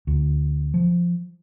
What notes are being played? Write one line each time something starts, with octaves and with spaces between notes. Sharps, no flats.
D2
F3